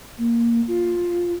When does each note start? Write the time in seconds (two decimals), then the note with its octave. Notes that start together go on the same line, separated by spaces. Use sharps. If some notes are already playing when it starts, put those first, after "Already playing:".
0.18 A#3
0.68 F4